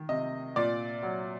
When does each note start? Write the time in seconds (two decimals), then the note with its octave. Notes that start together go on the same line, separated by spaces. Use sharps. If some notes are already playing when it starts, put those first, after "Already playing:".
Already playing: D#3
0.09 C3 D#5
0.56 A#2 D5
1.03 F#3